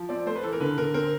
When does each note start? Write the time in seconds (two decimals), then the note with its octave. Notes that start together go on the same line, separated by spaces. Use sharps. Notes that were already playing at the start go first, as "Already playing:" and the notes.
Already playing: F3
0.09 C4 D5
0.26 A3 C5
0.36 B4
0.43 E3 A4
0.53 A#4
0.60 D3 B4
0.77 D3 A#4
0.94 C4 A#4